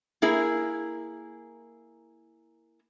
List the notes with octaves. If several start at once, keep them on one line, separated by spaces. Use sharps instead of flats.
A#3 E4 G#4 A#4